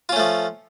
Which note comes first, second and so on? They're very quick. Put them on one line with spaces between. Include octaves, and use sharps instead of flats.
F4 C#4 A3 F3